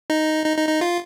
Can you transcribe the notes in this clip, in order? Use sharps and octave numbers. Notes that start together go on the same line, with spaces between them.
D#4
D#4
D#4
D#4
F4